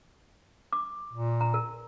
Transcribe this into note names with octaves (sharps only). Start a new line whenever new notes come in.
D6
A#2
A#5
A#4